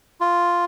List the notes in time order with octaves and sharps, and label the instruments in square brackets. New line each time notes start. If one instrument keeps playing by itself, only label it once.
[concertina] F4